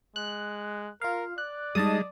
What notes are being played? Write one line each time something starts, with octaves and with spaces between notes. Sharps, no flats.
G#3 F#6
F4 A#4 F5
D5 F#6
G3 G#3 D#4 D#5 A5 D#6